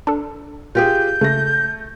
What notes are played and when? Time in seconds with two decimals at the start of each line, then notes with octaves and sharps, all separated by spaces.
0.07 D4 A4
0.75 A#2 F4 G4 G#4 G6
1.21 C#3 A3 A#6